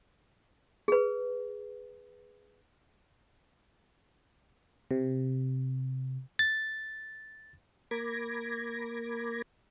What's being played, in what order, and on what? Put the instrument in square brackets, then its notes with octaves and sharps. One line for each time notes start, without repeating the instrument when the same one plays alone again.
[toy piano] G#4 B4
[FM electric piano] C3
[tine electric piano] A6
[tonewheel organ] A#3 A#4 B5 D6 G#6 A#6